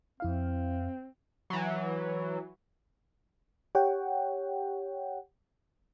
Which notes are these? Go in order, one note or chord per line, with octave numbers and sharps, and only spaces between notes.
F2 C4 E4 F5
E3 F#3
G4 C#5 F#5 G5